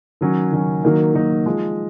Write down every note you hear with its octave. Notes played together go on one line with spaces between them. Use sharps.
D#3 F#3 C#4
D#3 F#3 C#4
D#3 F#3 A#3 D#4
D#3 F#3 A#3 D#4
F3 G#3 D#4